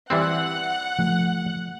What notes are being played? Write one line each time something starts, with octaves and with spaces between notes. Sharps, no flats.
E3 G3 C4 F#5
F3 A3